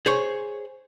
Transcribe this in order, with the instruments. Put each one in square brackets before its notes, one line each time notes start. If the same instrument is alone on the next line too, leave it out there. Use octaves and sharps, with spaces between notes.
[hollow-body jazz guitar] G#4 C5 C#5